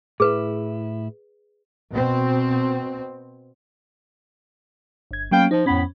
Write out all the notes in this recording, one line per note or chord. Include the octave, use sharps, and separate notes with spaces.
A2 E4 G#4 B4
B2 C4
G1 G#6
F#3 A#3 B3 C#4 F5 G5
F3 D#4
F2 A2 B3 C#4 B5